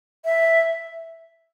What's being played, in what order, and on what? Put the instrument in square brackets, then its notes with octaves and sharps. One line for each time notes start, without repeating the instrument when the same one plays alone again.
[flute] E5